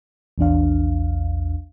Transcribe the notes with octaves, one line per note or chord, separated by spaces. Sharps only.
A#1 E2 D4 F5